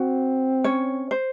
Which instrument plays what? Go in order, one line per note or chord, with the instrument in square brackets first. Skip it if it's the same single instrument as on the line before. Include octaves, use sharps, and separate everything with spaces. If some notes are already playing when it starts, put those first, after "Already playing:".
Already playing: [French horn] C4 [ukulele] F#4
[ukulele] C#4 C#5
C5